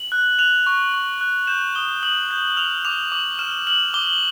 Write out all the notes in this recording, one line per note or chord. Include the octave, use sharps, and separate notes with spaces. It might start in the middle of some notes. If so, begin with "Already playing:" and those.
Already playing: F#7
F#6
F#6 F7
C#6
C#6
F#6
G6 E7
D#6 G7
D#6 F#7
G6
F6 F7
D6 F7
D6 F#7
F6 E7
F6 F#7
D6 G7